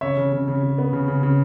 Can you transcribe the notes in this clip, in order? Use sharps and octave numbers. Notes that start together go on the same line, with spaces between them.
C#3 C#5 E5
C#3
C#3
C#3
C#3
B3
C#3
C#3
C#3